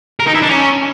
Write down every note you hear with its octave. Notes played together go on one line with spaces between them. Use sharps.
A#4
D#4
E4
D4
C#4